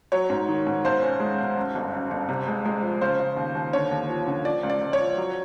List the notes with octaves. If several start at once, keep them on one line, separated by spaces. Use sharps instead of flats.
F#3 C#5
G#2
D#3
G#2
B1 C5
C#4
G#3
B1
F#2
G1
F#2
G1
C3
G#3
G#3
F3
C#3 C5
C#3
D#2
D#2
D3 C#5
D#2
F3
D3
F3 D5
C#2
D5
C#2
C#5
F3
F#3